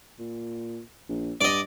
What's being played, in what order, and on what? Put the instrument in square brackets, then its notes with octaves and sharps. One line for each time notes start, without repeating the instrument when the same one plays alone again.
[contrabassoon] A#2
A#1
[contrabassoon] G2 [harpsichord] D5 D#5